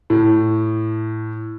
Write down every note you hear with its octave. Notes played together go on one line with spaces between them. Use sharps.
A2